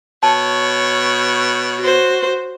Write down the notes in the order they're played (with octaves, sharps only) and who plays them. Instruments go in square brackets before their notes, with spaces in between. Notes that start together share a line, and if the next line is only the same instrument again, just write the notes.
[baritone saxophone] B2 [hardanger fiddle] C#5 [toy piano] A5
[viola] F#4 C5